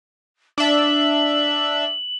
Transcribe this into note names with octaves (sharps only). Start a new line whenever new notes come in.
D4 E5 F#7